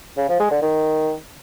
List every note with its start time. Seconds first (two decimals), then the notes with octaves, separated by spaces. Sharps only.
0.17 C#3
0.28 F3
0.40 G#3
0.51 D3
0.62 D#3